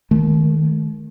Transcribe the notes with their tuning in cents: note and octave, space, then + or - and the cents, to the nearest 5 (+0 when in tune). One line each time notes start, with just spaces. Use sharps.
D#3 +0 A3 -45